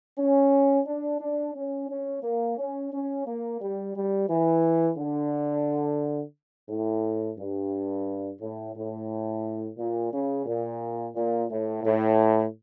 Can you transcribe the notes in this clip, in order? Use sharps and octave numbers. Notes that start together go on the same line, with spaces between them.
C#4
D4
D4
C#4
C#4
A#3
C#4
C#4
A#3
G3
G3
E3
D3
A2
G2
A2
A2
A#2
C#3
A#2
A#2
A2
A2